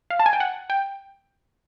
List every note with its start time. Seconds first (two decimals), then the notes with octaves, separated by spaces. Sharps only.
0.10 F5
0.20 A5
0.26 G#5
0.33 G5
0.40 F#5
0.70 G5